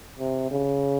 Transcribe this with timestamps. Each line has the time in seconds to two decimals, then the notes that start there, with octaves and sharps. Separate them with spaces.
0.19 C3
0.51 C#3